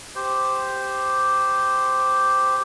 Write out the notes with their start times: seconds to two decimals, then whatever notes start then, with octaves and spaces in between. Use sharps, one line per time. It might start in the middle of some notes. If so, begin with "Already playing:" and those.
0.15 G4 C5